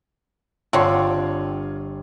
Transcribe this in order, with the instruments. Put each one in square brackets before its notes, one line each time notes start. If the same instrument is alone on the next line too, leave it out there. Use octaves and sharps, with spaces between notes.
[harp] G1 C#6 [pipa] D3 C4 [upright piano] F4 C#5 F#5